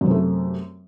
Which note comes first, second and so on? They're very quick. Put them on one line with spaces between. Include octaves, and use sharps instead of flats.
F#2 C3 A3